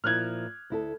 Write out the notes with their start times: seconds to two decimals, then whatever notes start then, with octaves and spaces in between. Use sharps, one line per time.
0.04 A#2 F3 E4 F6 F#6 G#6
0.70 D2 E4 A4